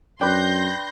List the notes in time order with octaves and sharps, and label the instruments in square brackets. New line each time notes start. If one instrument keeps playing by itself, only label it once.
[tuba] F#2 [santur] D4 B4 [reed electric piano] G5 [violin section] C6 G6 A#6